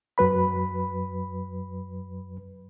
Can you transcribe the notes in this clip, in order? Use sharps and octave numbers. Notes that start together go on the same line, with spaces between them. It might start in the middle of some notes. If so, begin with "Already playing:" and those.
F#2 F#3 B4 B5